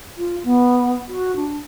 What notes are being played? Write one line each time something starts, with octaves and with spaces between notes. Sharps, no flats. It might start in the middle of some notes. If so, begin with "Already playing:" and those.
F4
B3
F#4
D4